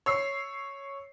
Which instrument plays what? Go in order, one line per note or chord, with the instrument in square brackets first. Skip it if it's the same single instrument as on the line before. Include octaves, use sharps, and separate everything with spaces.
[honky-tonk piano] C#5 E6 C7